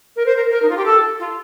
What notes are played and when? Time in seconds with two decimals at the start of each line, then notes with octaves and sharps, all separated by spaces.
0.16 A#4
0.26 C5
0.36 A#4
0.51 A#4
0.62 D#4
0.69 F4
0.77 G4
0.85 A4
1.20 F4